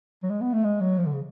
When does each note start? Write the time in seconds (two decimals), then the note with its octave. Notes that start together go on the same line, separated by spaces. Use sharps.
0.23 F#3
0.30 G#3
0.41 B3
0.53 A3
0.64 G#3
0.81 F#3
0.98 F3
1.06 D3
1.13 C#3